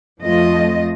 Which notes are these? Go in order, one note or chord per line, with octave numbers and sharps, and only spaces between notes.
F2 F3 A3 F4 D#5